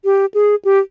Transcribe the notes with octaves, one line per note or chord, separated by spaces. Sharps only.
G4
G#4
G4